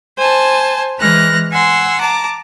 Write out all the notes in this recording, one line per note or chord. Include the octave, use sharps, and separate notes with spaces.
C5 G#5 A5
E3 G#3 F6 F#6 A#6
F#5 G#5 C6 E6
A5 A#5 D6